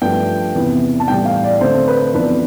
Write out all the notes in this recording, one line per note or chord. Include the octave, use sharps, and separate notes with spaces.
G2 F3 A3 G5
E2 C3 E3 B3
A5
A2 E3 G3 B3 D4 G5
F5
D5
D3 A3 C4 C5
B4
F2 E3 B3 D4 B4